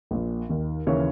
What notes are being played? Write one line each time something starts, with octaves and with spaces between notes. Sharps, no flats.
A#1 A#2
D#2 D#3
D#2 C#3 E3 C#5